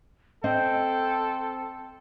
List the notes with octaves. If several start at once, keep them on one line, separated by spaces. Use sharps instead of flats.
C4 A4 D#5 G5